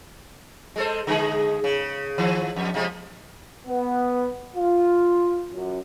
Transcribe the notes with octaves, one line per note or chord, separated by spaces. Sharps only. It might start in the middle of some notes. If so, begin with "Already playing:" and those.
G#3 A4 C5
D3 G#3 G#4
C#3
D#3 F3
F2
C3 F3 G#3
B3
F4
F#2